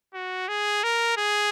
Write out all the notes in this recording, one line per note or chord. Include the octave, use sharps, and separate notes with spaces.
F#4
G#4
A#4
G#4